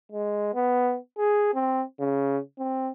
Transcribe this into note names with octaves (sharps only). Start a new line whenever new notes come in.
G#3
B3
G#4
C4
C#3
C4